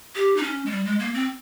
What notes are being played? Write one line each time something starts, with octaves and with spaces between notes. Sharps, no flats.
G4
D#4
C#4
G#3
G3
G#3
A#3
C4